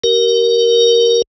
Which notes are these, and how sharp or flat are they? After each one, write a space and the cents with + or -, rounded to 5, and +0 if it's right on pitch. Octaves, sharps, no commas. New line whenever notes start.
G4 -35 A#4 +5